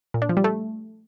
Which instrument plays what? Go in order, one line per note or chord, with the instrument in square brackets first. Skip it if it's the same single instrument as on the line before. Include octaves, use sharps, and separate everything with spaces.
[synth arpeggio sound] A#2
D4
F3
G3
A3